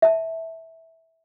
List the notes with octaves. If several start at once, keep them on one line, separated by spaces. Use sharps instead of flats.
E5 A5